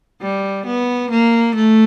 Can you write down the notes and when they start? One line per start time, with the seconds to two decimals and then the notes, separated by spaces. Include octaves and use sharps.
0.22 G3
0.66 B3
1.11 A#3
1.55 A3